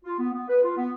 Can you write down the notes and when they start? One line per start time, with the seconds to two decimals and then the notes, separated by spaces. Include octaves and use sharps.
0.04 F4
0.18 B3
0.33 B3
0.48 B4
0.62 F4
0.77 B3